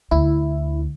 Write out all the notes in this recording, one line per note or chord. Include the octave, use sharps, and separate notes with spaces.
D2 E4